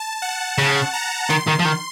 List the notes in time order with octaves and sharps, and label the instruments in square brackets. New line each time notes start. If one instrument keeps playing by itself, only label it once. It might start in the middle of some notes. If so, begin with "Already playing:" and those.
Already playing: [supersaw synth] A5
F#5
[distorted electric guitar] C#3 [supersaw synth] A5
[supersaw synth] A#5
[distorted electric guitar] D#3 [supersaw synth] C6
[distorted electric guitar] D#3
F3
D#3